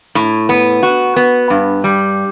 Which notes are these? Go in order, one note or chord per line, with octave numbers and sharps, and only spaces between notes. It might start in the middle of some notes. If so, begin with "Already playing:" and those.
A2
B3
F#4
B3
G2
G3